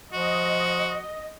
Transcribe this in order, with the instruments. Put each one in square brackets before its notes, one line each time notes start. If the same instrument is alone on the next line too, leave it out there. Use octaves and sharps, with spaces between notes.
[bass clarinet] F3 [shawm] F#4 [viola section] D#5